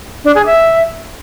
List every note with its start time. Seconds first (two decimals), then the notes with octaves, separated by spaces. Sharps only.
0.25 D4
0.35 G#4
0.46 E5